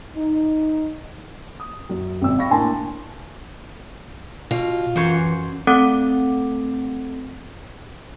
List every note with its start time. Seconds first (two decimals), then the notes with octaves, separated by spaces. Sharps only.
0.16 D#4
1.60 D#6
1.89 F#2
2.22 G#1 C3 E6
2.38 F5 G5 B5 C#6 A#6
2.50 A2 A#3 D4 G#5 A5 C6
4.51 B2 F4
4.96 F#2 E3 C5 C#5
5.67 A3 C4 A4 F#5 D6